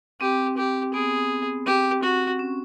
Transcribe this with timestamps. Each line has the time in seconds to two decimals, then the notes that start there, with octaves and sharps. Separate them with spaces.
0.21 C4 G4
0.57 G4
0.94 B3 G#4
1.66 C4 G4
2.03 F#4
2.39 C#4